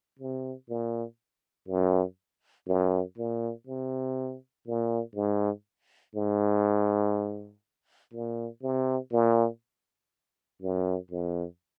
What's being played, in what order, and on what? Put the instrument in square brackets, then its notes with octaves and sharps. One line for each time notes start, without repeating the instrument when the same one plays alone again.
[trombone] C3
A#2
F#2
F#2
A#2
C3
A#2
G#2
G#2
A#2
C3
A#2
F#2
F2